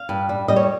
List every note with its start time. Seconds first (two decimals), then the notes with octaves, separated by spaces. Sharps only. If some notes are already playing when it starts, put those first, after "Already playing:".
Already playing: F5
0.09 G2
0.29 G3
0.48 G3 D#5
0.56 C#5